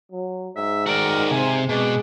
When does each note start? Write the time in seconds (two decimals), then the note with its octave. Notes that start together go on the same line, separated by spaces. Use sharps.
0.12 F#3
0.56 G#2 E5
0.86 D#3 F#4 A#4 D5
1.31 C3 G#5
1.69 B2 G#3 D4